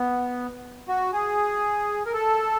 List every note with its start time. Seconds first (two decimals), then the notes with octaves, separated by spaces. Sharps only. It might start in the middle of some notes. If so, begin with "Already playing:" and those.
Already playing: B3
0.88 F#4
1.13 G#4
2.06 A#4
2.13 A4